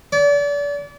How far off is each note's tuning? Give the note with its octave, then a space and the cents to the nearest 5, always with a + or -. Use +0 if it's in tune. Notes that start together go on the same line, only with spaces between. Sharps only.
D5 -35